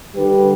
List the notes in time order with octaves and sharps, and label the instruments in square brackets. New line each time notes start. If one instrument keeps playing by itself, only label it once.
[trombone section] D3 G3 G4 B4